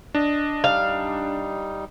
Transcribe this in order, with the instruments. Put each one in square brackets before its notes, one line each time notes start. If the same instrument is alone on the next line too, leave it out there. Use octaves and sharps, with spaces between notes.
[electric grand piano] D4 [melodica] D#5
[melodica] G3 D#4 [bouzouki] F5